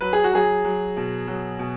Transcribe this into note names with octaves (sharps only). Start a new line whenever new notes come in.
F#3 B4
G#4
F#4
F#3 G#4
F#3
B2
F#3
B2